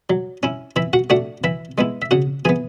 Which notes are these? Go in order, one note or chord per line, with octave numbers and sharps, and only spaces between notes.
F#3
C#4 E4
E3 E4 E5
F#4 F#5
A3 D4 F#4 F#5
E3 E4 E5
G#3 B3 E4
E5
C#3 F#4 F#5
E3 B3 G#4 G#5